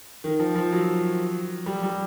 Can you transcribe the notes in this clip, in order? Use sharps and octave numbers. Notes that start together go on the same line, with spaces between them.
D#3
F3
F3
F#3
G3
G3